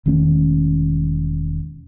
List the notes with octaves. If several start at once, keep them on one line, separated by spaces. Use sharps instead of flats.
E1 D#3 A3 C#4